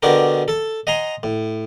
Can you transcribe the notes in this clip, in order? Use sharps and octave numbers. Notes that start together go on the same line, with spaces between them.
B2 D3 D4 F#4 G4 A#4
A4 A5
D#5 F#5 G#5 A#5 C6
A2